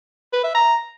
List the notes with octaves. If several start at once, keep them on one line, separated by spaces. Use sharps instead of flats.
B4
E5
A#5